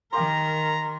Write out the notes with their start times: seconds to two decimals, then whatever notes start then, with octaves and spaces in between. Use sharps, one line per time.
0.13 D#3 A#3 G4 A#4 A#5 C6